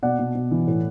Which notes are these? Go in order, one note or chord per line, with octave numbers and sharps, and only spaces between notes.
B2 D5 F#5
B2
B2
E3
A2